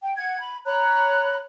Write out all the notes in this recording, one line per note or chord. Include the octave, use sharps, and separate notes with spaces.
G5
F#5 G#6
B5
C#5 A#5 B5 F#6